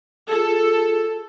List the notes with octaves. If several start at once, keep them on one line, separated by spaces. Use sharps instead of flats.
F4 G#4 A4